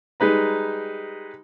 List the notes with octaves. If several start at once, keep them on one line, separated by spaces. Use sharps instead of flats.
G3 G#3 D#4 B4 A#5